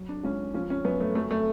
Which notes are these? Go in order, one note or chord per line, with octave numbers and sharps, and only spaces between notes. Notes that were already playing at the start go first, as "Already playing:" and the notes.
Already playing: F#3
D4
C#2 C#4
F3 C#4
C#4
F#2 B3
A3
F#3 A3
A3